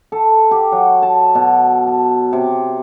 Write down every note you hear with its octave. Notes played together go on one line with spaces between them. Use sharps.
A4
G4
F#3
A5
B2
A5
C3